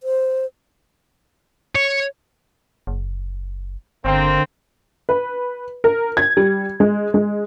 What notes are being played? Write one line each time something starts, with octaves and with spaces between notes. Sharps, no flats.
C5
C#5
F#1
G1 D3 A#3 C4
B4
A#4
G#6
G3
G#3
G#3